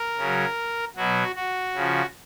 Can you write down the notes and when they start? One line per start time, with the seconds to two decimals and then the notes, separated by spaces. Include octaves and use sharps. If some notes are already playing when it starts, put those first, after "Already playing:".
Already playing: A#4
0.18 C#3 F#3
0.96 B2 F#3 F#4
1.35 F#4
1.74 C#3 F3